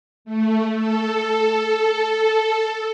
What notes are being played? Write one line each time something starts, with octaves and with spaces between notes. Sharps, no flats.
A3
A4